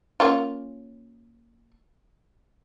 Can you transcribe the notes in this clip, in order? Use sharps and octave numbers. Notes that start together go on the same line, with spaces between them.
A#3 C#4 F4